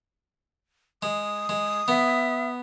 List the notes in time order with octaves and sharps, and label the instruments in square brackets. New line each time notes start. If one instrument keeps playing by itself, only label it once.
[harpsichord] G#3 [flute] D#6
[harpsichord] G#3
[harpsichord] B3 [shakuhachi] E5